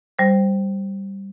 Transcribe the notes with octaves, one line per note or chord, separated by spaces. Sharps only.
G3 C5